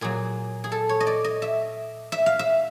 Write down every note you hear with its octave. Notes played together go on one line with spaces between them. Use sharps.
A#2 F#3 G#4
G#4
A4
C#5
D#5
D5
D#5
E5
E5
F5
E5